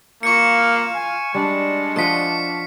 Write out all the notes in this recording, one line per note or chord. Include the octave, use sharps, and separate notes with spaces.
A#3 F4 F5 C#6 F6 C#7
G#5
G3 G#3 D4
F3 F#4 D#5 B6 C#7